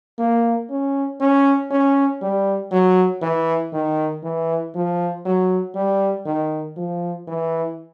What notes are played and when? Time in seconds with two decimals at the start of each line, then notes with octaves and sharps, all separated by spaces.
0.19 A#3
0.70 C#4
1.20 C#4
1.71 C#4
2.21 G3
2.71 F#3
3.22 E3
3.73 D#3
4.23 E3
4.75 F3
5.25 F#3
5.75 G3
6.26 D#3
6.77 F3
7.27 E3